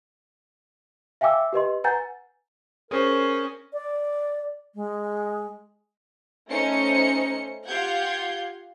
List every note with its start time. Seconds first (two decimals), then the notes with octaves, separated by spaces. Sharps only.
1.21 E5 F5 G5 G#5 D6 E6
1.53 G4 B4 D#5 C6
1.84 B4 F#5 G#5 A#5 G6 A6
2.91 C#4 G#4 A#4 C5
3.73 D5
4.75 G#3
6.49 A3 C#4 D#4 C5 C#7
7.66 F4 G4 F5 F#5 G6 G#6